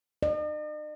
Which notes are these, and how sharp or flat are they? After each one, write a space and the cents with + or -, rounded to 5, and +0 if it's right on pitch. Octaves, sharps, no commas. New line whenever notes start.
D#5 -45